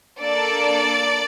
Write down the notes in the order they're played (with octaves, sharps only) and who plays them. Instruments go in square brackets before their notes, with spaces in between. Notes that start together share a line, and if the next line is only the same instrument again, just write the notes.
[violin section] A#3 D4 A4 D5